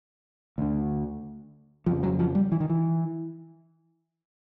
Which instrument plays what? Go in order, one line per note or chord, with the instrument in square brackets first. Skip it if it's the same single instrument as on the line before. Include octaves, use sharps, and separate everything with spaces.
[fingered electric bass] D2 D3
F2 C#3 F3
F#3
F3
G3
E3
D#3
E3